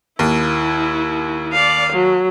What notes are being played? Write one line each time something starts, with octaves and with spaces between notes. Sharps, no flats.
D#2 E4
D5 F5
F#3